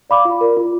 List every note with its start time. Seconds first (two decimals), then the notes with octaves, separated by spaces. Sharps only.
0.10 D5 F5 B5 D6
0.25 F4
0.41 A#4 D5
0.57 F4